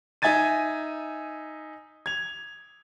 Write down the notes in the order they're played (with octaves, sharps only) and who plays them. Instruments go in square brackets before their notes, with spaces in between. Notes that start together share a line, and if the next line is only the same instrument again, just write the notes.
[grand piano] D#4 E5 G#5 G#6 A6 D#7
G#6 F7